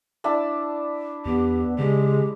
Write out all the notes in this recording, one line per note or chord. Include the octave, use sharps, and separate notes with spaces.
D4 E4 A5
E2 B3 G4
C#3 G#3 G4